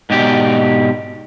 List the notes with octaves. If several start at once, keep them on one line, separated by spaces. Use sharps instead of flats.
G#2 B2 G4 D5